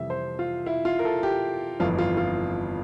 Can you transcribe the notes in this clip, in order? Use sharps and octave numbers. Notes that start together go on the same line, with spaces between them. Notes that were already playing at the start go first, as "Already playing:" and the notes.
Already playing: F2 C3 E3 G3 E5
C5
F4
E4
F4
A#4
A4
G4
G1 F2 E3 F4
F4
F4